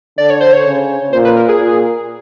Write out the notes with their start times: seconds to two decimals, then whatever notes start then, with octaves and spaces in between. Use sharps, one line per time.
0.18 D3 D5
0.30 C#5
0.41 C5
0.53 C#5
0.65 C#3
1.13 A#2 C5
1.25 B4
1.36 A#4
1.49 G#4
1.60 A#2